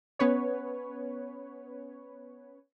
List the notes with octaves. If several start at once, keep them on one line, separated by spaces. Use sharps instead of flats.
B3 C#4 B4 C#5